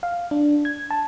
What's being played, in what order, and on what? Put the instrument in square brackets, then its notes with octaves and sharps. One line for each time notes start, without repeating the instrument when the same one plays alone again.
[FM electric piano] F5
D4
G#6
A5